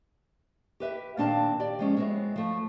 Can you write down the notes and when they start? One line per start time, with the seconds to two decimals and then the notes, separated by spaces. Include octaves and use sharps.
0.80 G4 B4 E5
1.17 A#2 D#3 C4 D4 F5 A5
1.60 G4 D5
1.79 F3 G#3 C#4
1.97 G#3 B3 C4 D4 E4 C#5
2.36 F3 A3